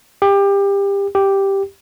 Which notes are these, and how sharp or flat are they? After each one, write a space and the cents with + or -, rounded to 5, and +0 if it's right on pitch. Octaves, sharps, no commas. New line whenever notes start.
G4 +25
G4 +0